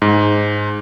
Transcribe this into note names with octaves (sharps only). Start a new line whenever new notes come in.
G#2